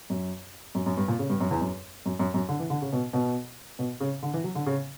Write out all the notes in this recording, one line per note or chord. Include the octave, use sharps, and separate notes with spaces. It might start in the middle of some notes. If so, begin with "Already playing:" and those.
F#2
F#2
F#2
G2
A#2
C#3
G2
F#2
E2
F#2
F#2
F#2
F#2
D3
E3
D3
C#3
B2
B2
B2
C#3
D3
E3
F#3
D3
C#3